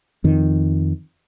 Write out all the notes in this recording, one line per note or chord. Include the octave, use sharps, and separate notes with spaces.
F2 D#3